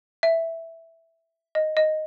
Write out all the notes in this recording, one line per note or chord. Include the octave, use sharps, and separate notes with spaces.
E5
D#5
D#5